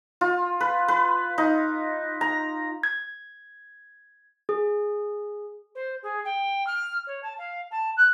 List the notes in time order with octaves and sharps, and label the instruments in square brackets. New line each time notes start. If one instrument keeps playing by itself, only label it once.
[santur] F4
B4
B4
D#4
A#5
[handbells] G#6
G#4
[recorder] C5
G#4
G5
F6
C#5
A5
F5
A5
F#6